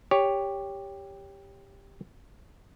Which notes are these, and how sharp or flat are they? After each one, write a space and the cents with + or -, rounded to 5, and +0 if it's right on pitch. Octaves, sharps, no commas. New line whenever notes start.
G4 +10 C#5 +10